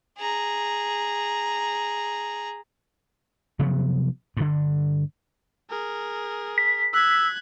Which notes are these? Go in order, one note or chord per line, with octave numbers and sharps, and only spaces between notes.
G#4 A#5
C3 F3 F#3 B3
G2 D3
G#4 A#4
B6
E6 F#6 G#6